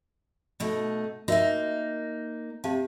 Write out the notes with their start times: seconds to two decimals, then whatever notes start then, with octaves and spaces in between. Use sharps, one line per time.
0.60 B2 A3 D#4
1.28 A#3 D#4 F#4 A#4 E5
2.64 C3 G4 F5 A5